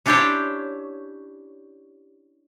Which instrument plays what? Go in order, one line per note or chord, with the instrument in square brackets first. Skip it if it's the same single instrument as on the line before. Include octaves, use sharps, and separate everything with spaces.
[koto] C#4 D4 E4 G4 C5 C#5